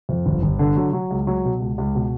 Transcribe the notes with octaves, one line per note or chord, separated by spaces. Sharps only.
F2
G1
G1
D3
F#3
F#3
C#2
F#3
B2
C#2
C#2
B2